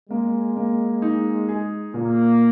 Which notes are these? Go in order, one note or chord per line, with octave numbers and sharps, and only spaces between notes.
G#3 A#3
A#3
D#4
G#4
A#2 A#3